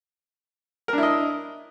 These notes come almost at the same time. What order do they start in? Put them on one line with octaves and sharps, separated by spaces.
A#4 D4 E4 D#5